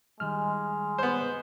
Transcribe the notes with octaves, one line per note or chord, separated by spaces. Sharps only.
D#3 G3 G#3 F6
B3 C5